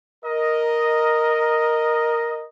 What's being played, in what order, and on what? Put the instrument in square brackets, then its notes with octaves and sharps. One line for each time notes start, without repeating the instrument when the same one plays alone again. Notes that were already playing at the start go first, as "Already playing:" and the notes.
[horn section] A#4 D#5